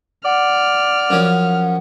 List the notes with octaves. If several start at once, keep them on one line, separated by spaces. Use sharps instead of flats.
D5 F#5 F6
F#2 F3 C#4